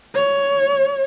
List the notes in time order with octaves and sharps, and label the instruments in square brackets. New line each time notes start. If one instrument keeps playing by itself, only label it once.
[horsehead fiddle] C#5